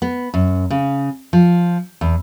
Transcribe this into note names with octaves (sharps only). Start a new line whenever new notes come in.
B3
F#2
C#3
F3
E2